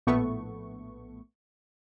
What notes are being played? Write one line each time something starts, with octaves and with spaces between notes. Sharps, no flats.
A#1 A2 A3 B3 C#6